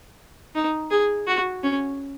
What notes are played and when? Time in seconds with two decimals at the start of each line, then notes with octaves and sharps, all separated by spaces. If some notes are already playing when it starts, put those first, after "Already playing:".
0.55 D#4
0.91 G#4
1.28 F#4
1.63 C#4